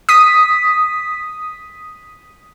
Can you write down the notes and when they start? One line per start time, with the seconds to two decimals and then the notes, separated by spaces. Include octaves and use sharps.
0.09 D#6 B6